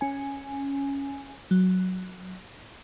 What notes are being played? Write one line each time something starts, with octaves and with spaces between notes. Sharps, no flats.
C#4 G#5
F#3